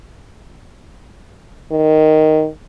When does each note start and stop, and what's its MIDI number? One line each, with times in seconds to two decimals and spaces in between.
1.71 2.48 51